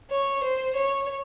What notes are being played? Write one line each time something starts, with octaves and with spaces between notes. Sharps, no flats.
C#5
C5
C#5